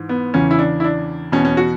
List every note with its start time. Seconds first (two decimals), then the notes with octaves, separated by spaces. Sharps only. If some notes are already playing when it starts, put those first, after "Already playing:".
Already playing: G#2 E3
0.09 B3
0.34 E2 C#3 E3 C#4
0.51 E4
0.59 D4
0.80 E4
0.84 D4
1.32 E2 B2 C#4
1.45 C#4
1.57 F#4